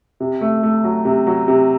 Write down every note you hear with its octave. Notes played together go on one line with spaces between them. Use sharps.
C3
A3
A3
F#3
C3
F#3
C3